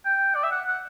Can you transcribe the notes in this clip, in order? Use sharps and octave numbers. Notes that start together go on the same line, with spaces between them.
G5
D5
E5
F#5
F#5